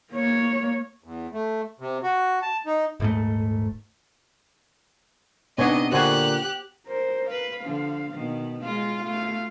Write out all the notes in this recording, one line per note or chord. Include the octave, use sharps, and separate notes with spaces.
A#3 C#5
E2
A3
C3
F#4
A5
D#4
D#1 G#2 A3
C3 B3 D4 D#4 C#5 D#5 G#5
A#2 D3 F#4 G4 C5 G#5 F#6
A#4 C5
B4 F5
D3 F3
B2 D#3
G#3 F4 F5
A3 F5